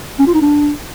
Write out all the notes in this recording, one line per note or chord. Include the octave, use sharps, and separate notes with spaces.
C#4
F4
D#4
D4